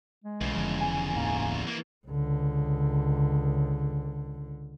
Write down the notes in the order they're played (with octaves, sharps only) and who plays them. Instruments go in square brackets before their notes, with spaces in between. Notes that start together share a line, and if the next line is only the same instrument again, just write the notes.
[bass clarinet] G#3
[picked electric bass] B1 [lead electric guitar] E2 C#3
[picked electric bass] F1 D3 F3
[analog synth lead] G#5
[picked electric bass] D#1 C2 G#2 [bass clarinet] A#3
[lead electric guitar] E3 A#3
[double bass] C#2 D3